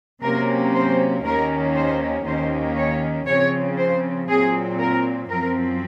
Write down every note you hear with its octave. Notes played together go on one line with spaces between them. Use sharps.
C3 F#3 A#3 C#4 A#4
C5
D#2 D#3 A#3 C#4 A#4
C5
D#2 D#3 A#3 C#4 C5
C#5
C#3 F3 C4 C#5
C5
A#2 F#3 C4 G#4
A#4
F#2 F3 C4 A#4